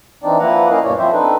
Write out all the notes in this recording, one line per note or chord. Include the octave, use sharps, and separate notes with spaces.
E3 C4 D4 D#4 D5
F3 A#3 E4 B4 F#5 A#5
A#3 C#4 E4 A#4 D#5 F5
D2 G2 B2 A#3 C#5 D5
F3 C4 C5 E5
C4 D4 D#4 A4 B4